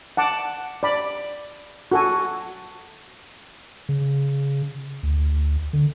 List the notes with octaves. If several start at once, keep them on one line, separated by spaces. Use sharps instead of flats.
F#5 A5 D6
D5 B5
F#4 A4 G#5
C#3
D2
D3